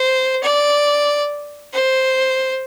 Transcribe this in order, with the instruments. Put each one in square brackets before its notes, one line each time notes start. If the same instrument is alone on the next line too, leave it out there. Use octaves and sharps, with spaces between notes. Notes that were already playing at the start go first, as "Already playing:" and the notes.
Already playing: [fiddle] C5
D5
C5